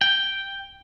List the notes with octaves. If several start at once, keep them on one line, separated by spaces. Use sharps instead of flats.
G5